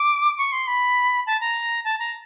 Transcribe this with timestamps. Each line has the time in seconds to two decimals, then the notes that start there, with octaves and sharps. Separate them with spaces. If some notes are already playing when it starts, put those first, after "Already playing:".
Already playing: D6
0.38 C#6
0.52 C6
0.67 B5
1.26 A5
1.41 A#5
1.84 A5
1.99 A#5